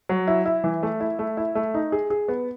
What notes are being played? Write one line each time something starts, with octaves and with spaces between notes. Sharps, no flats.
F#3
E4
E4
E3
A3
E4
A3
E4
A3
D#4
G#4
G#4
B3